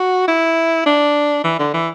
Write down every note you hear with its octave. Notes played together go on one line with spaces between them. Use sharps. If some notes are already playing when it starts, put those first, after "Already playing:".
Already playing: F#4
E4
D4
E3
D3
E3